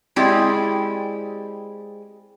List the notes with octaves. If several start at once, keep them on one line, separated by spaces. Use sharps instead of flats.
G#3 C4 E4 G4 G#4 D5